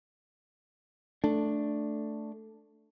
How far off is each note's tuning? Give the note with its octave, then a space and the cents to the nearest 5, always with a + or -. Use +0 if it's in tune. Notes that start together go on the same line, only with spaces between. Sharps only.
A3 +0 D4 +0